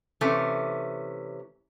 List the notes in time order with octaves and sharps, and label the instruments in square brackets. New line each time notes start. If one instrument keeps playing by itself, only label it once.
[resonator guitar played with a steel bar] C3 E3 A3 C#4